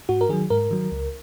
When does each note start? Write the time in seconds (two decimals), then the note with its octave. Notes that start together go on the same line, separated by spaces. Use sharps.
0.09 G#2 F#4
0.21 A#4
0.29 D#3 F#3 G#4
0.50 G#2 A#4
0.71 D#3 F#3
0.92 C#2